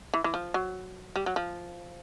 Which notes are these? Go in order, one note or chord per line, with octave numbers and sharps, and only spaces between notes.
E3
E3
F3
F#3
G3
F#3
F3